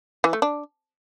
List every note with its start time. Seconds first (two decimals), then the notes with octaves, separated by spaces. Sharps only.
0.24 E3
0.33 A3
0.42 D4